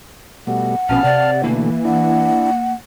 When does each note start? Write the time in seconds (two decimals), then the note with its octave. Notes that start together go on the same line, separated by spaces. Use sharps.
0.47 B2 G3 A3 F#5
0.89 A#1 B2 B3 C#4 F5 A5 F6
1.04 C3 D5
1.43 B2 D3 E3 A3 A#3
1.85 D4 E4 F#5